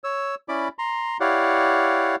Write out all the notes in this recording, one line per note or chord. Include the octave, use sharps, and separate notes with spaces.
C#5 E6
C#4 E4 D5 B5 D6
A#5 C6
E4 G4 C#5 D5 F5 F#5